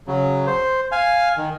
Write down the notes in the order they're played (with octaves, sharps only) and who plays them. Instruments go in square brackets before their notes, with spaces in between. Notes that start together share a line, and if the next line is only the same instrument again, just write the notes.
[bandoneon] C#3 F#3
C5
F5 G#5
D#3